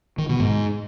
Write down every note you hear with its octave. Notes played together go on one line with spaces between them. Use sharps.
D#3
B2
G#2